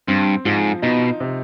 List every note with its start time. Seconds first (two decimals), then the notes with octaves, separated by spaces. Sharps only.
0.07 G2 C4
0.45 G#2 F3
0.82 B2 D#4
1.20 C3